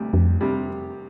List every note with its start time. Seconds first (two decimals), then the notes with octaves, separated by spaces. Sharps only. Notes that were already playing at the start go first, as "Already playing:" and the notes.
Already playing: D2 C3 G3
0.13 F2
0.41 C3 G3